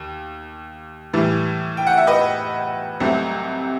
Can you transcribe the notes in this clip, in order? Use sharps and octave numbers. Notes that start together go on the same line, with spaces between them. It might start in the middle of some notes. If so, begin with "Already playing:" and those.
Already playing: D#2
A2 E3 G3
G5
F#5
E5
B4 D#5
C2 C3 F#3 A3